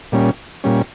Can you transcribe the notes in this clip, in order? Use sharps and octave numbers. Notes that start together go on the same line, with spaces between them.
A#2 G3 C#4
A#2 G3 C#4